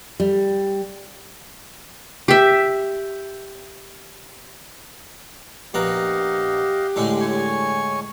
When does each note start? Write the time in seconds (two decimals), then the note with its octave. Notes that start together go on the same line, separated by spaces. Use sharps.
0.20 G3
2.28 G4 E5
5.74 A#1 B3 G4 D#5 F5 F#5 A#5
6.96 A2 D3 G#3
7.20 C#5 G#5 C#6